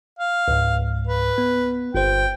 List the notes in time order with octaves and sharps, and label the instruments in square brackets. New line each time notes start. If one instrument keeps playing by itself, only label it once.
[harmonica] F5
[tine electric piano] C#2 G#2
[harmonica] B4
[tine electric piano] B3
[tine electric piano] G1 C5 [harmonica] G5